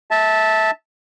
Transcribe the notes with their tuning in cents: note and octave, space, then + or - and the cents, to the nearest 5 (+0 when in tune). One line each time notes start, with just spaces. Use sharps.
E5 -20 A5 +0